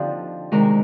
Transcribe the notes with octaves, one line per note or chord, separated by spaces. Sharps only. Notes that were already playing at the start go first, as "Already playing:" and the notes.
Already playing: D3 F3 C4 D#4 G4
C3 D#3 G#3 A#4